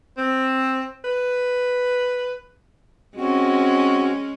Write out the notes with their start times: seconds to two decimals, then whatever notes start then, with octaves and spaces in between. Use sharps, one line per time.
0.18 C4
1.05 B4
3.17 G#3 C4 C#4 F#4